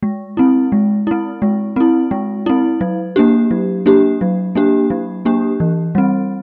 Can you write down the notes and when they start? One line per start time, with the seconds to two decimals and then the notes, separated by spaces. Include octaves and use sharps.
0.03 G#3
0.37 C4 E4
0.72 G#3
1.07 C4 E4
1.42 G#3
1.76 C4 E4
2.11 G#3
2.46 C4 E4
2.81 F#3
3.16 A#3 D4 G4
3.51 F#3
3.86 A#3 D4 G4
4.21 F#3
4.55 A#3 D4 G4
4.90 F#3
5.25 A#3 D4 G4
5.60 E3
5.95 G3 C4